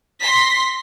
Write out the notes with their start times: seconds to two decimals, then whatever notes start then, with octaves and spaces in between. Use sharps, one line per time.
0.19 C6 A#6 B6